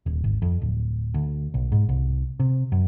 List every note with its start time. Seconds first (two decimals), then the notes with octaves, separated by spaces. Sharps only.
0.06 D#1
0.24 G#1
0.42 F2
0.61 D1
1.14 D2
1.54 B1
1.72 G#2
1.89 C2
2.40 C3
2.72 F#2